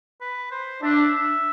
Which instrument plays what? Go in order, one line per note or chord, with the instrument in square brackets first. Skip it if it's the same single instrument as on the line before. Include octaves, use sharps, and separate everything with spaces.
[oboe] B4
C5
[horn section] D4 [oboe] E5